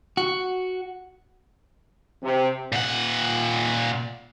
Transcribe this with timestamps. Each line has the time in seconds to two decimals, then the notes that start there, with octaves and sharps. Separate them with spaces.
0.17 F#4
2.23 C3
2.72 A#2 F#5